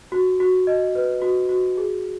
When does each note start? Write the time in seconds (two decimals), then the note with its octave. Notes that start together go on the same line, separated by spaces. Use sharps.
0.12 F#4
0.40 F#4
0.67 D#5
0.95 B4
1.22 F#4
1.49 F#4
1.77 G#4